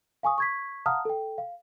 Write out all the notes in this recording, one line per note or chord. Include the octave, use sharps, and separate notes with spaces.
F5 G#5 C#6 D#6
C#6 G#6 B6
F5 F#5 A5 A#5 D#6 F6
A4 G5
F5